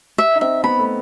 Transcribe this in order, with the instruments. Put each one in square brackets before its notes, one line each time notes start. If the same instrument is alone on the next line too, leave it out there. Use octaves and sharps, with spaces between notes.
[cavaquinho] E5
[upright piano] D#4
[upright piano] C4 [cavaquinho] E5
[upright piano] B3 [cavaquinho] B5
[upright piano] A3